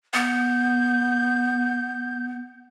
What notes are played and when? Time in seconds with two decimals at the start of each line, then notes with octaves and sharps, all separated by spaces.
0.14 B3 G6